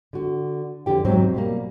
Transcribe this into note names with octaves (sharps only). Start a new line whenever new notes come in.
D3 F#4
F2 D3 G4 G5
G#2 B2 F#3 C4
B2 G3 A#3